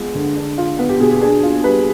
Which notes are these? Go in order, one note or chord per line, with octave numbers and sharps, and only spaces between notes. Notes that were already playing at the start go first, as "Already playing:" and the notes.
Already playing: G#3 B3 F4
D3
D4
F4
B3 B4
G4
B2 G#4
G#4
D4 G#4
F4
G3 B4